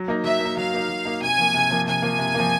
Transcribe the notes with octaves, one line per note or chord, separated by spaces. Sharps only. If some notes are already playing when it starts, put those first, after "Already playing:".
Already playing: F#3
A#3 D#4
F#3 E5
A#3 D#4
F#3 F5
A#3 D#4
F#3
A#3 D#4
C3 G#5
F3 A#3
C3
F3 A#3
C3 G#5
F3 A#3
C3
F3 A#3